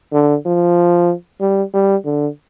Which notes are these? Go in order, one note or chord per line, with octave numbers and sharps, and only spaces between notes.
D3
F3
G3
G3
D3